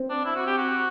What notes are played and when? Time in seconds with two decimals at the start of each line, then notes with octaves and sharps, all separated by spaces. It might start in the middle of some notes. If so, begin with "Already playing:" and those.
Already playing: C4
0.10 D4
0.25 E4
0.36 F#4
0.47 G4
0.58 F#4